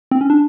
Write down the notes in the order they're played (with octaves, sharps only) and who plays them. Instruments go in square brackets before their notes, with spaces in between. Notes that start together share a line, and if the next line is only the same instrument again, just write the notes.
[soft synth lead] C4
C#4
D4